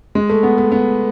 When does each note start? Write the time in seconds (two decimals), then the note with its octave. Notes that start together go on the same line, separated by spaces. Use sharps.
0.15 G#3
0.30 A3
0.43 B3
0.58 A3
0.72 B3